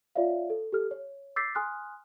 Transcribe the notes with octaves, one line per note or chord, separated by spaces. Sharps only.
F4 C#5 D5 E5 F5
A4
G4 A4 F6
C#5
D6 E6 G6 A6 B6 C7
G#5 C6 D#6 F6 F#6